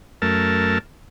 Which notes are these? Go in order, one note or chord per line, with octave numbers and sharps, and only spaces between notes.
F#2 A3 A#4 A5